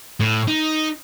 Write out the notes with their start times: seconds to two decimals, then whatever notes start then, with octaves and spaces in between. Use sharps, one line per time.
0.20 A2
0.47 D#4